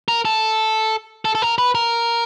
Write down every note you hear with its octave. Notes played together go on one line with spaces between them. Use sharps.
A#4
A4
A4
A4
A#4
B4
A#4